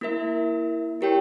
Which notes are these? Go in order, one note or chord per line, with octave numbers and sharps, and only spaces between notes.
A#3 E4 A#4 E5
E4 G4 A#4 C#5 G5